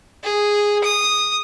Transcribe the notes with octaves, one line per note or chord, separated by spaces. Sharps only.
G#4
D#6